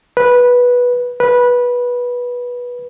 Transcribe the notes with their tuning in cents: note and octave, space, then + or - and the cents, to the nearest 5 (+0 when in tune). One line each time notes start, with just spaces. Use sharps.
B4 -10
B4 -15